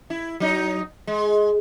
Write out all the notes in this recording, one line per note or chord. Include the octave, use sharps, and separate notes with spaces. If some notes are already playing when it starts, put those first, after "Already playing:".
E4
F#3 D#4
G#3